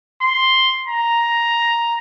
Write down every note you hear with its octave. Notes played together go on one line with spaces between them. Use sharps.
C6
A#5